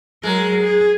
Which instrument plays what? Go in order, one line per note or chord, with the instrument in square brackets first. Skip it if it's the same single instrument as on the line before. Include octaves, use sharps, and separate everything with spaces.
[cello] F#3 A#4 [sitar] G#3
[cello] G#4